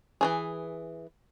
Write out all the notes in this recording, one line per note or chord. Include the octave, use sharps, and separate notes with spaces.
E3 F3 G#4